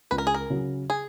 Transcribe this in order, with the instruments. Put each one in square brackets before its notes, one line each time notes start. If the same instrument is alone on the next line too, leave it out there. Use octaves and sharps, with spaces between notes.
[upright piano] C#2 [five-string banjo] B4
[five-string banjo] A#4
G#4
A#4
[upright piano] C#3 F#3
[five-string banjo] G#4